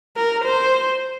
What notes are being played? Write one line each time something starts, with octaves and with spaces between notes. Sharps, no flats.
A#4
C5